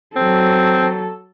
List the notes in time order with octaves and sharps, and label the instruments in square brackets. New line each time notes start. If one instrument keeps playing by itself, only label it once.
[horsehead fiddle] F#3 A4 [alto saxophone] C4